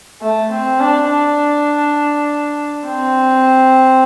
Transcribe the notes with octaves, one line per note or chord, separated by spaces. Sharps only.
A3
C4
D4
D4
C4